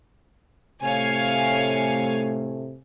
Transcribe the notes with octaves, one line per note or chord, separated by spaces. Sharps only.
A2 C3 A3 C#5 F5 G#5